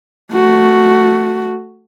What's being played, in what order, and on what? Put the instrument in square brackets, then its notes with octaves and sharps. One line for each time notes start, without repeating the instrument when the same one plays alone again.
[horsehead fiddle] A3 F#4